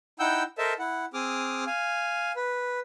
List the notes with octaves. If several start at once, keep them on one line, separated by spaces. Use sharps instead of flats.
D#4 E4 F#5 G5 E6 G6
A4 A#4 C5 D#5 E5 A5
E4 F#5
C4 G#4 D6 D#6 F6
F5 G#5
B4